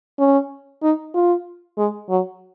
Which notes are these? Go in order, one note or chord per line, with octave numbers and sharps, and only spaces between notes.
C#4
D#4
F4
G#3
F#3